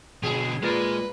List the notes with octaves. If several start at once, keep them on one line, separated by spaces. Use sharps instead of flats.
B2 D3 F3 G#4
A#2 G#3 F4 A#4 B4 D5